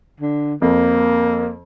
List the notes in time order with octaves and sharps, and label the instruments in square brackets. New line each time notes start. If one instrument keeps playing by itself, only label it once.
[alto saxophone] D3
[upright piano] F2 [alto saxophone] A#3